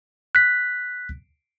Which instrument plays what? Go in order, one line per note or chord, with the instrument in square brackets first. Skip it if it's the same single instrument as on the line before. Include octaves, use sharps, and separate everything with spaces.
[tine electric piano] F#6 B6